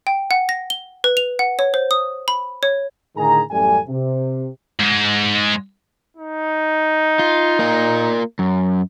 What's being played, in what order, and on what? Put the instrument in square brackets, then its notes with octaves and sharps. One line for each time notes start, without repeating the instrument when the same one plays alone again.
[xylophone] G5
F#5
A#6
G7
B4
F7
F#5
C#5
C5
D#6
B5
C#5
[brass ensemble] A2 D3 D#3 G#4 G#5 A#5
A1 F#2 G3 A3 A4 G#5
C3
[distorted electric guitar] G#2 G#3
[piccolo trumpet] D#4
[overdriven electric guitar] F4
A#3 F4
F#2